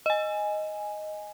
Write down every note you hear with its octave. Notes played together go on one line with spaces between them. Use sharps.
D#5 G#5